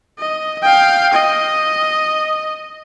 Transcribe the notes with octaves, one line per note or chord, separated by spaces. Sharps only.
D#5
F5 G5
D#5